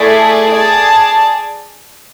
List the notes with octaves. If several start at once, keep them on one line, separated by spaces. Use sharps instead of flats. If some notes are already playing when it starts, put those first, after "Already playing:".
Already playing: A3 E4 G#4 D5
G#4 D5 A5